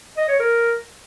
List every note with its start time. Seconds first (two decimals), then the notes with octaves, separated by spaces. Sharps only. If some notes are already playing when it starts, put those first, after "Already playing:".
0.17 D#5
0.28 C#5
0.39 A#4